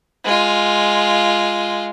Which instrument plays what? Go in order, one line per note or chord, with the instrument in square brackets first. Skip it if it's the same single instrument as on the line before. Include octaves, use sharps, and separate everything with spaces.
[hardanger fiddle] G#3 F4